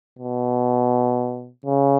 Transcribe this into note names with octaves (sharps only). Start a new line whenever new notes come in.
B2
C#3